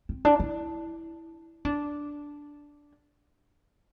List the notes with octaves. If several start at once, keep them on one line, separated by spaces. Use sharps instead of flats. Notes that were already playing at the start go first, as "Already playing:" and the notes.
C4
D4
E4
D4